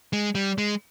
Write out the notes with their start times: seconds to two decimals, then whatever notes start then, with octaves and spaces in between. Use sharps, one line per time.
0.13 G#3
0.35 G3
0.58 G#3